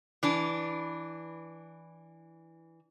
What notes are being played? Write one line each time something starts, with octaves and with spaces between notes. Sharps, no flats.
E3 D4